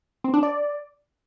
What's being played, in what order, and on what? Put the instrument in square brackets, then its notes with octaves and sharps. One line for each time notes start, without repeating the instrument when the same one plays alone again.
[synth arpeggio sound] C4
D4
D5